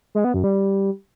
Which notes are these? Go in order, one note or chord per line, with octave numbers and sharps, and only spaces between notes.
G#3
B3
F#2
G3